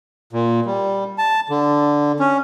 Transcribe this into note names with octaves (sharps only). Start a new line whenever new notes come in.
A#2
G3
A5
D3
C#4